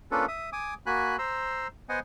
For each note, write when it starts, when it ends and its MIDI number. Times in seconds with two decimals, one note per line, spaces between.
0.11 0.26 58
0.11 0.26 61
0.11 0.26 62
0.11 0.26 65
0.11 0.26 69
0.11 0.26 71
0.28 0.50 76
0.28 0.50 87
0.53 0.74 80
0.53 0.74 86
0.53 0.74 87
0.86 1.17 58
0.86 1.17 66
0.86 1.17 80
0.86 1.17 83
0.86 1.17 90
1.19 1.67 72
1.19 1.67 82
1.19 1.67 84
1.19 1.67 88
1.89 1.99 59
1.89 1.99 72
1.89 1.99 75
1.89 1.99 78
1.89 1.99 80